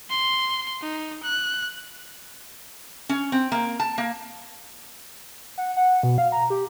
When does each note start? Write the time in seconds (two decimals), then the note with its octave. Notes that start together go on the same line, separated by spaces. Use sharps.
0.10 C6
0.81 D#4
1.23 F#6
3.09 C#4
3.32 C4
3.52 A#3
3.80 A5
3.98 A#3
5.58 F#5
5.77 F#5
6.03 B2
6.18 F5
6.32 A#5
6.50 G4